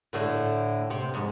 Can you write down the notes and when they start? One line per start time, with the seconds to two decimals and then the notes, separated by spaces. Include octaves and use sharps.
0.13 A2 D3 A3
0.90 C3
1.14 F2 G#2